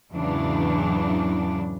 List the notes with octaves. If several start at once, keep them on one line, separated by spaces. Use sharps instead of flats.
E2 G#2 C#3 E3 F#3 D4